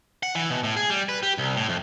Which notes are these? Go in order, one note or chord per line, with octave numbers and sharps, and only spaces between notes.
F#5
E3
B2
A2
G#4
G3
B4
G4
C2
A2
F2